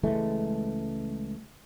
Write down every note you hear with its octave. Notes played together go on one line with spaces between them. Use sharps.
C#2 E3 G#3 A3